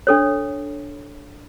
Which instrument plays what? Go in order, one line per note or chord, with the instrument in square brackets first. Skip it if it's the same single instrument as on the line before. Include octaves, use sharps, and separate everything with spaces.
[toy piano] D4 A4 C#5